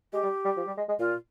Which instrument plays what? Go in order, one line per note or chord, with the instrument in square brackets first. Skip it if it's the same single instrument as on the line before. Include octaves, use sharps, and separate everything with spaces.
[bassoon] G#3 [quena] G4
[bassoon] G3
G3
F3
G3
G#3
G#3
[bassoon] A#2 [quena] F4